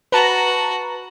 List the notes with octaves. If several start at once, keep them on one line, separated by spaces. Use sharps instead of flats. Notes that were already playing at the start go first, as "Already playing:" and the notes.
F#4 B4 A5 A#5